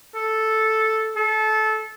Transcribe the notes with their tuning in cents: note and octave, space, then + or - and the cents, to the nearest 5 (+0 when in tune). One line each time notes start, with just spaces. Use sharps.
A4 -5
A4 -20